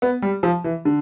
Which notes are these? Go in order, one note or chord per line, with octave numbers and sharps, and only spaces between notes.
B3
G3
F3
E3
D3